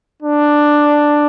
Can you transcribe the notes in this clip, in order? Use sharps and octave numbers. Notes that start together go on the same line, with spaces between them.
D4